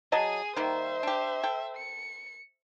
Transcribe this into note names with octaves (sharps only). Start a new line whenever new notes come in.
F#3 G#4 D#5 A5 D#6
D#3 G3 A#3 C5 E5
D4 G4
A4 G5
C#7